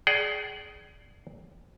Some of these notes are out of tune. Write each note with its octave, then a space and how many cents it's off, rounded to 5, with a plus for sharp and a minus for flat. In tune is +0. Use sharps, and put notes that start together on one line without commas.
G#4 +15 D5 +0 G5 -45